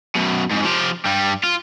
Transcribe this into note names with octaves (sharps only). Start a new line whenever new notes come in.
F#2 B2
F2 G#2
F3 G4
G2 G3
F4